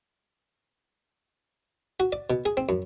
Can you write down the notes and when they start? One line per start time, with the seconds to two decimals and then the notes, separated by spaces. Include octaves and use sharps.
2.00 F#4
2.12 D5
2.30 B2
2.46 G#4
2.57 C4
2.69 F#2